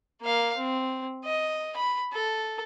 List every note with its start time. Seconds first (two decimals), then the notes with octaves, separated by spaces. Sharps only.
0.22 A#3 F5
0.57 C4
1.25 D#5
1.76 B5
2.13 A4